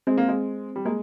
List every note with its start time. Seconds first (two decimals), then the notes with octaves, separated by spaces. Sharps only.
0.07 G#3 C4
0.18 A#3
0.28 G#3
0.76 G3
0.85 G#3 A#3